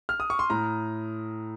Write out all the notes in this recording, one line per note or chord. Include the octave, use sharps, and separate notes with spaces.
F6
D#6
C#6
C6
A2 A#5